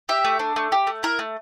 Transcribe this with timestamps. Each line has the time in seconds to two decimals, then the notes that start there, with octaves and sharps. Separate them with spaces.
0.09 G4 E5
0.25 A3
0.39 D4
0.56 A3
0.72 G4
0.87 A3
1.03 E4 A#4
1.19 A3